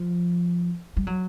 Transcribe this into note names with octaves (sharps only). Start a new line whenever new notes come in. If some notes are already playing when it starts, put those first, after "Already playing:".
Already playing: F3
G3
F#3